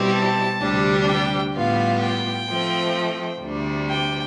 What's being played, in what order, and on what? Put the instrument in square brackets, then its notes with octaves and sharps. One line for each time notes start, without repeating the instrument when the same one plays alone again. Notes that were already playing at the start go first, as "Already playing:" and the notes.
Already playing: [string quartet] B2 G3 C4 E4 G4
[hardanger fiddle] A5
[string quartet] D2 C3 G3 D4 G4
[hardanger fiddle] G5
[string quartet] A2 G3 B3 F4 [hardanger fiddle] F5
[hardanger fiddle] G5
[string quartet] F3 A3 C4
D2 C3 G3 D4
[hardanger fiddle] G5